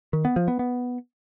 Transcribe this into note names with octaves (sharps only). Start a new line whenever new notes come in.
D#3
B3
F3
B3
B3